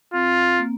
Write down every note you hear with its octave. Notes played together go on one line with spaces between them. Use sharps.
C4 F4
A#3